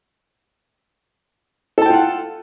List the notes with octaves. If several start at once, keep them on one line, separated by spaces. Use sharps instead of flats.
F4 A4 F#5 G5 A5